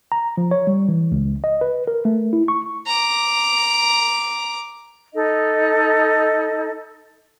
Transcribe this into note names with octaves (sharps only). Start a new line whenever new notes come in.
A#5
F3
C#5
G3
E3
C#2
D#5
B4
A#4
A3
E4
C#6
A#5 D6
D#4 A4 D#5